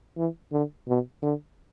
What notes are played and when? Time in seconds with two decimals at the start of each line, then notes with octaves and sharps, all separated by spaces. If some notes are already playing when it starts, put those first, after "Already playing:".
0.17 E3
0.52 D3
0.88 B2
1.22 D3